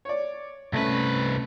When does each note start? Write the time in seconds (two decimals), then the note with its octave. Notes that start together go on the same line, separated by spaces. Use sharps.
0.05 C#5 D5
0.73 C2 A3 C#4 B4